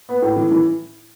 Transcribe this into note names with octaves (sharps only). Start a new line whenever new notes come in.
B3
A2
E3
E3